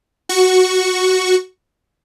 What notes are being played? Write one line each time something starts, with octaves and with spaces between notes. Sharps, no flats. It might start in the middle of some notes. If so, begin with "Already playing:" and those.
F#4 C#6